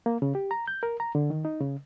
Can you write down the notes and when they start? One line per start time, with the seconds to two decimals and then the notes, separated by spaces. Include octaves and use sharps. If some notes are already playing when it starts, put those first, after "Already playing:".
0.06 A#3
0.22 C#3
0.35 G4
0.51 A#5
0.68 G6
0.83 A#4
1.00 A#5
1.15 D3
1.30 D#3
1.45 D#4
1.61 C#3